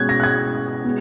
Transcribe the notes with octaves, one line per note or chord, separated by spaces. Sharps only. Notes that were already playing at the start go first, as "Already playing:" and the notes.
Already playing: B2 G#3 C#4 F#6 G#6
A#6
F#6
G#6
B2 G#3 B3